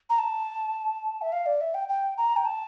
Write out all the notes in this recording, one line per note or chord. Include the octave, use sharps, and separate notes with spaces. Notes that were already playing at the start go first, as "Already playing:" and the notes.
A#5
A5
E5
F5
D5
E5
G5
G5
A#5
G5
A5